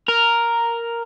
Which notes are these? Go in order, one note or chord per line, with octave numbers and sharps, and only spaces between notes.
A#4